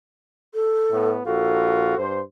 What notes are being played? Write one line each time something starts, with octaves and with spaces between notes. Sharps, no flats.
A4
A2 A3 B3
A#1 F4 F#4 A4
G2 C5